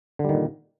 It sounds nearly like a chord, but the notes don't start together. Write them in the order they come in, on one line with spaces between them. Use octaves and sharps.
D3 G3 D#3 A#2